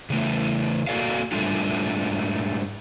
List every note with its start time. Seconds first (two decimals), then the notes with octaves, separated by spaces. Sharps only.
0.10 C#3 E3 A3
0.87 A#3 F#4 A4 D5 F5
1.32 G#2 G3 A3 D4 F4